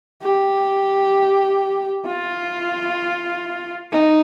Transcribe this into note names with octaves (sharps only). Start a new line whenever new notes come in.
G4
F4
D#4